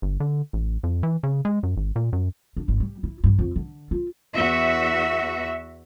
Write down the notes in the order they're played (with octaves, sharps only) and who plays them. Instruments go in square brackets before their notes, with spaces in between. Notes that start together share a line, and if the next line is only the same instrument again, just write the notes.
[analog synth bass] G1
D3
A1
F2
E3
C#3
G#3
F#2
G#1
A#2
F#2
[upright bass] D4
G#1
G3
E4
G2
F2
D3
F4
[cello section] E2 F#4 E5